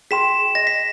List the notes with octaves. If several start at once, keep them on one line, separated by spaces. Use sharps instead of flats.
G#4 G5 C6 B6 E7
D#5 A#6
B6